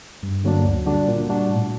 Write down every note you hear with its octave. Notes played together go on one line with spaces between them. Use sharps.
G2
D3 F#3 A#3 D4
D2
D3 G3 D4 F#4
A#2
G3 D4 F#4
A2